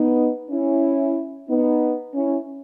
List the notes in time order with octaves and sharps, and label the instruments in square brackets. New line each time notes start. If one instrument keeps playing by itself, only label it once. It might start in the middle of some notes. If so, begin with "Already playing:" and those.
Already playing: [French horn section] B3 D#4
C#4 E4
B3 D#4
C#4 E4